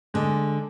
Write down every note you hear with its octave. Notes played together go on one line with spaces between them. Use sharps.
D3 G#3